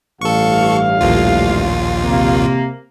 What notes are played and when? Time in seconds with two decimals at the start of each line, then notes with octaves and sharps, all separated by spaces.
0.21 A1 G2 A4 F5 C#6
1.01 A#1 D#2 F4
2.04 C3 A#3